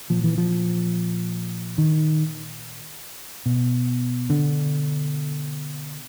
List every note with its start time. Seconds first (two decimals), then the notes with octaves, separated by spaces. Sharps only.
0.10 A#2 F3
0.24 E3
0.38 F3
1.78 D#3
3.46 B2
4.30 D3